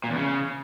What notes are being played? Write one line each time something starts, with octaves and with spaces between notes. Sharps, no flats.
A#2
E2
C#3